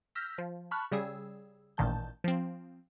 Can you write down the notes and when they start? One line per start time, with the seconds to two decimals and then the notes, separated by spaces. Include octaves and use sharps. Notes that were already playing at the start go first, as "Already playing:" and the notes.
0.15 E6 F6 G6 A#6 B6
0.38 F3
0.71 A5 B5 C#6 F6 F#6
0.91 C#3 G3 G#4 E6
1.77 A1 A#2 D#3 A5 G6
2.24 F3 C4